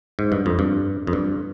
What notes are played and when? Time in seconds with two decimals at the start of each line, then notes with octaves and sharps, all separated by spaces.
0.19 G#2
0.32 G2
0.46 F2
0.59 G2
1.07 F2
1.13 G2